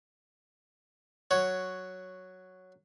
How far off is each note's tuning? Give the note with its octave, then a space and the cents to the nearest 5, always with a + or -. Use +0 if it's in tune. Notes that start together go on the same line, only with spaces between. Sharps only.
F#3 +0 C#5 +0